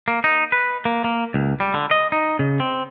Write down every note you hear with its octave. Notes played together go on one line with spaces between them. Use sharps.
A#3
D#4
B4
A#3
A#3
C#2
G3
D3
D#5
D#4
C#3
C4